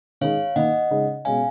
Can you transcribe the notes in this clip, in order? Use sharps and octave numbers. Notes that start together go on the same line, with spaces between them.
D#3 G#3 D#4 C#5 F5
D#3 A#3 D#4 D#5 F#5
C#3 G#3 D#4
B2 G#3 C#4 F5 G#5